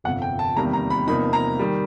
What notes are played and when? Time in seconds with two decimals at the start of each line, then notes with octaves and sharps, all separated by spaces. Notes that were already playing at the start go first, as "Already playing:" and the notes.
0.04 G1 F2 C3 F#5
0.22 G5
0.39 A5
0.56 E2 C3 D#3 G3 A#3 A#5
0.73 A#5
0.90 B5
1.07 E2 C3 F3 A#3 D#4 B5
1.33 A#5
1.59 D#3 G3